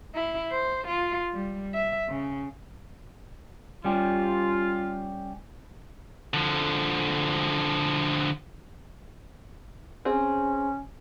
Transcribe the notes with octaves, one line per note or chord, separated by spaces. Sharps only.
E4
C5
F4
G3
E5
C#3
G3 C#4 F4 G4
D3 F3
C4 C#4 G#4